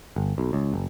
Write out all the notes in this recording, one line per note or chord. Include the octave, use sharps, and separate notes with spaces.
G1
B1
C#2
F#1